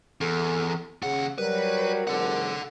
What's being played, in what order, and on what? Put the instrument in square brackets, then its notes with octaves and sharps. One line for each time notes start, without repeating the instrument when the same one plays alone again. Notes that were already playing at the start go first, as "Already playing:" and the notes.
[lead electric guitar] E2 [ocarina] A4
[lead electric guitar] D#2 F#5 [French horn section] C#3 [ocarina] G#4
[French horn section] F#3 G3 [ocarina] A#4 [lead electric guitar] B4
[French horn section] F2 G#2 F#3 [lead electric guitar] A4 F#5